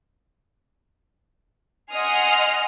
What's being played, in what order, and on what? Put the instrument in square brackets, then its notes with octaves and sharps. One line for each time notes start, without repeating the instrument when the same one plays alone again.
[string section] D#5 F#5 G#5 C6 D#6 F6